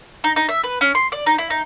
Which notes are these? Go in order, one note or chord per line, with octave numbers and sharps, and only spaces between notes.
D#4
D#4
E5
B4
C#4
C6
D5
D#4
E4
D#4